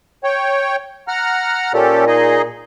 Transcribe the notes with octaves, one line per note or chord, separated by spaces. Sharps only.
C#5 G5
F#5 A#5 F6
A#2 C#4 G4 A4
D#4 G#4 D#5